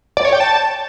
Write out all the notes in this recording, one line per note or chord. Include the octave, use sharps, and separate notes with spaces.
D5
C#5
G5
A5